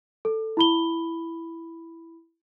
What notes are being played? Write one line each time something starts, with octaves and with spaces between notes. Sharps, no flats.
A4
E4 B5 G7